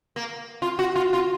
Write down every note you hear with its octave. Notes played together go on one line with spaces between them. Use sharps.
A#3
F4
F#4
F4
F4